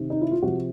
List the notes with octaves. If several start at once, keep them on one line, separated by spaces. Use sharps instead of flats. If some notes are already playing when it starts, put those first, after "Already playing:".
Already playing: C3 D#3
D#4
E4
F4
C3 F3 F#4